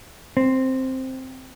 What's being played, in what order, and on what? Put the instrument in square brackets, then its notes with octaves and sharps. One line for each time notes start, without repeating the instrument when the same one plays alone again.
[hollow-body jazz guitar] C4